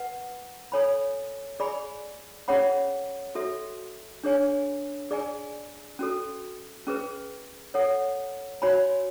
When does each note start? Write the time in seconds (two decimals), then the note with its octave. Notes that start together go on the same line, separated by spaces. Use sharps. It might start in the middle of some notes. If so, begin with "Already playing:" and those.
Already playing: B4 F#5
0.72 A4 C#5 G#5 B5
1.60 G#4 D5 G#5 B5
2.48 C#4 G#4 C#5 F#5 B5
3.35 F#4 A4 E5
4.24 D4 G#4 C#5 G#5
5.11 G#4 D5 G#5
5.99 C#4 F#4 A4
6.87 C#4 G#4 B4
7.74 A4 C#5 F#5
8.62 F#4 C#5 G#5 B5